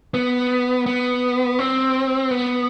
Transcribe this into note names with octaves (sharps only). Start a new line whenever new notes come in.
B3
B3
C4
B3